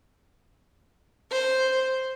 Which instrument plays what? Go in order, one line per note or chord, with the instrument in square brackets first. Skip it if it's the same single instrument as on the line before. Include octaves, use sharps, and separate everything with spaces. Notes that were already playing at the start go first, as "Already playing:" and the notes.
[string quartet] C5